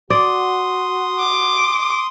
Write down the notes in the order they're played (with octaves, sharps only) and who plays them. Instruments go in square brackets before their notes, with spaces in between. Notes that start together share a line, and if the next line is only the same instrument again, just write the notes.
[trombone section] F#4 [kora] D5 [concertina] C6 D#6
[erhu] D6